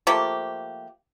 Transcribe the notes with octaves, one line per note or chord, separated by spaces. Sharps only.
F3 A3 A#3 G4